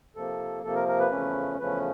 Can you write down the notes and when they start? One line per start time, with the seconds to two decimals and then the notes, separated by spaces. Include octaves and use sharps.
0.16 C3 F3 A#3 A4
0.64 C3 F3 A#3 A4
0.75 A#4
0.88 A#4
0.99 B4
1.11 E2 C#3 F3 A3 C#4
1.59 E2 C#3 F3 A3 C#4 B4